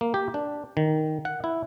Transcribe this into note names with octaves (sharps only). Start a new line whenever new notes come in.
A#3
G4
D4
D#3
F#5
E4